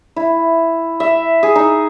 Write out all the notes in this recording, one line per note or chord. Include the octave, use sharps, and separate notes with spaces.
E4
E5
G#4
D#4